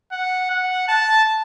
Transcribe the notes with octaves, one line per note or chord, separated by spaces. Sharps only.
F#5
F#5
A5